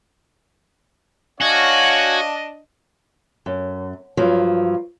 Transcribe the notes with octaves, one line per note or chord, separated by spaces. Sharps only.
D4 F#4 C#5 D#5 F5 G#5
F#2
G2 F3 F#3